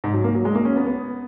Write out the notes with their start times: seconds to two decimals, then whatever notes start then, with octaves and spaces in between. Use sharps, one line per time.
0.04 G#2
0.14 F#3
0.24 A#3
0.35 F#3
0.45 G#3
0.55 A#3
0.65 C#4
0.76 B3
0.87 B3